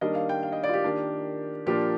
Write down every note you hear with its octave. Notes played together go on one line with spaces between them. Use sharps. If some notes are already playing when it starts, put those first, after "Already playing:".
D#3 G3 A#3 D4 D#5
F5
G5
F5
D#5
D5
F4
G4
D#3 A#3 D4
A#2 F3 A#3 D4 G4